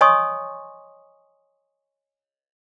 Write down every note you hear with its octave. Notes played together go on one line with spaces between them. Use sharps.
C#5 D#5 G#5 C6 C#6 D#6